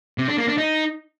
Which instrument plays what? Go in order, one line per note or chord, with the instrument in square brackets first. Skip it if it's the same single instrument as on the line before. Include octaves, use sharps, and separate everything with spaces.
[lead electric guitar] C3
D4
A#3
D4
D#4